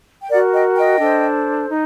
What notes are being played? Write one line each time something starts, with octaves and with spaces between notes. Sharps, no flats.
G5
F#4 A#4 D5 F#5
D#5 G5
D#5 G5
D4 A4 C5
D#4